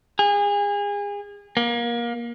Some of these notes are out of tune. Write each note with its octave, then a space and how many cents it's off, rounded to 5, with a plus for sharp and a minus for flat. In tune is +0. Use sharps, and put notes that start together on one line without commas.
G#4 -30
A#3 +25